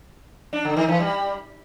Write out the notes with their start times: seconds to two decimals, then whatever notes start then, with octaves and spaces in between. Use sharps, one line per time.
0.53 D4
0.65 D3
0.77 D#3
0.88 E3
1.00 G3